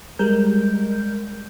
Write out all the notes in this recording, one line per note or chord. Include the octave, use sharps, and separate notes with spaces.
G3 G#3 A#4 G6